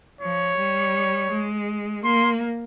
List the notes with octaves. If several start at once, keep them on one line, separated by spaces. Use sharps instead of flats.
F3 C#5
G3
G#3
A#3 C6